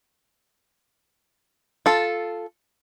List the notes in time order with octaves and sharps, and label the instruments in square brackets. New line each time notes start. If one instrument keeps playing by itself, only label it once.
[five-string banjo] F4 A4